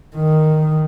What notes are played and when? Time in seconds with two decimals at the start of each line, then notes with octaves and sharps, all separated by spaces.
0.16 D#3